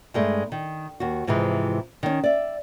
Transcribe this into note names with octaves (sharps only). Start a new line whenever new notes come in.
G2 G#3 A3
D#3
D#2 F#4
G#2 C3 E3 F3 G#3
D#3 C#4
D5 E5